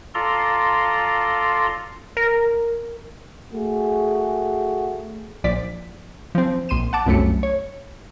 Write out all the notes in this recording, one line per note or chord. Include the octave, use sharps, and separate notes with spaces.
F4 A4 D5 A#5 C6
A#4
A3 F#4 G#4
A#1 F3 D5 B6
F3 C4
A#1 C6 D#7 E7
F#5 A5 D6
G1 C2 F#2 A3 C#7
C#5